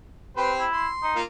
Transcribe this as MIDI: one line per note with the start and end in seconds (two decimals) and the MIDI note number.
0.37 0.64 60
0.37 0.64 67
0.37 0.52 71
0.37 0.64 72
0.59 0.88 64
0.72 1.15 84
1.03 1.18 63
1.16 1.23 58
1.16 1.23 65